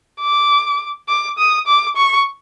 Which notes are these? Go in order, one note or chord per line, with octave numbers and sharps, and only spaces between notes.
D6
D6
D#6
D6
C#6